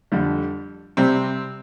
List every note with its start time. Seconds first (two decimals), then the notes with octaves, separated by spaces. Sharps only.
0.12 F2 D3 G3
0.97 C3 G3 C4